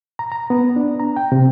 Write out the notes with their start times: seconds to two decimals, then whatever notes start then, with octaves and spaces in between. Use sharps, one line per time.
0.19 A#5
0.32 A#5
0.50 B3
0.76 D4
1.00 A#5
1.17 G5
1.32 C3